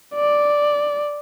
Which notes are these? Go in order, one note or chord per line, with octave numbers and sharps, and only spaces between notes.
D5